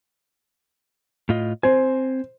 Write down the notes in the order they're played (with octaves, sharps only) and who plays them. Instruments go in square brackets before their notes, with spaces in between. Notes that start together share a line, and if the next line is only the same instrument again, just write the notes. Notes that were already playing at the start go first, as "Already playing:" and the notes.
[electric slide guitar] A2 F4 D#5
[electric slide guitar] C4 G#5 [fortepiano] C5